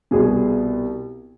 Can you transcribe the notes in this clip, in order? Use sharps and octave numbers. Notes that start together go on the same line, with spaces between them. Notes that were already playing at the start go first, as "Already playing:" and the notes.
C2 B2 G#4